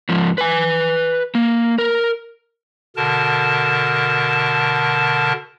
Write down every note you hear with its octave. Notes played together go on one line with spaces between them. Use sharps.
G#2 F3
B4 G#5
A#3
A#4
B2 D3 A#4 A5